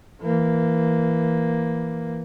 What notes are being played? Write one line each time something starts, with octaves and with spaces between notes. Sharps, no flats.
E3 A#3